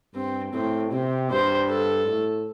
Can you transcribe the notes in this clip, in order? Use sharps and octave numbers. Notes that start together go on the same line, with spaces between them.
G2 C4
A2 C4
C3 C4
G2 C5
A4
A2